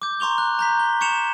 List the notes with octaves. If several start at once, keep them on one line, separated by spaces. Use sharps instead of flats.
D6 G6
A#5 C6 C#6 F7 G7
F#6
A#5 G6 B6
G7
C#6 G#6 C#7 E7 F7